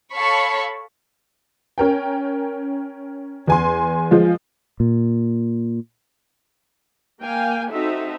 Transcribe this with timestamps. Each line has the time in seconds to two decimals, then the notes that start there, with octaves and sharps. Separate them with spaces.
0.14 A4 C#5 F5 A5 B5 C#6
1.78 C#4 A#4 G5
3.47 E2 G#5 C6
4.11 F3 G#3 F4
4.80 A#2
7.22 A#3 F5 G5 G#5
7.71 C4 D#4 F#4 A4 E5